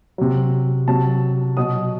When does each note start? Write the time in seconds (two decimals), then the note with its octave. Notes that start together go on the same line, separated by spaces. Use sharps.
0.18 C3 F#3
0.88 C3 F#3 A5
1.57 B2 F#3 D#6